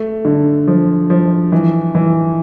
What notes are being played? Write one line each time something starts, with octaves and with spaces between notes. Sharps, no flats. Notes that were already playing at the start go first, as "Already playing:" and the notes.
Already playing: A3
D3
F3
F3
E3
E3